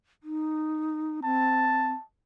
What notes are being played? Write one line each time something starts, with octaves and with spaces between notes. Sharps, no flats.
D#4
C4 A5